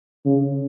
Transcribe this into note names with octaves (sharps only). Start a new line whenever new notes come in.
C#3